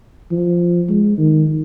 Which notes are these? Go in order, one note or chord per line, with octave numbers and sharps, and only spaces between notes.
F3
G#3
D#3